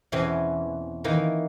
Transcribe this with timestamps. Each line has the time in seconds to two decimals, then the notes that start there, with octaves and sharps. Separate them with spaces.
0.12 E2 B2 E3 C4 C#4
1.04 D#3 E3 A#3